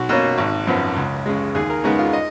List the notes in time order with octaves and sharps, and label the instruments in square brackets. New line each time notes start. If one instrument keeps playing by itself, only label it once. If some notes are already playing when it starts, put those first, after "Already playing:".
Already playing: [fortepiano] B1 F#4
B2 A#3 C#4
G#1
F#2 F3 B3
C#2
C#3 G#3
D#2 G#4
A#4
C#3 G#3 B3 D#4
F4
D#5